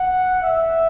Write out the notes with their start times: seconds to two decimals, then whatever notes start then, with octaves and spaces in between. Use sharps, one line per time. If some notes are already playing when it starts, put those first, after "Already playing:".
Already playing: F#5
0.43 E5